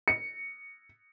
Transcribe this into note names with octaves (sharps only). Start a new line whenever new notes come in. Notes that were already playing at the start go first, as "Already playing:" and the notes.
C#7